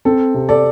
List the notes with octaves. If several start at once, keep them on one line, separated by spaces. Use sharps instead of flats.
C4 A4
C3
A4 D5